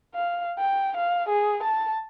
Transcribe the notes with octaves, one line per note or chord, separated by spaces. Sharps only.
F5
G5
F5
G#4
A5